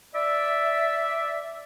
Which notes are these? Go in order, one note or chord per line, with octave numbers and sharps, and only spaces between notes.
D5 E5